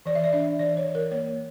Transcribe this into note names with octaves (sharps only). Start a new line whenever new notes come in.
E3 D5
E5
D5
D4 E5
E3 D5
C#5
E3
A#4
A#3 C#5